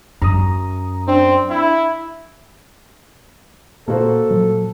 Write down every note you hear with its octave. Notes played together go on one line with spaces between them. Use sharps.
F#2 A#5 D#6
C4 D4
E4
A#2 A#3 F#4 A4 C5
A#2 F#3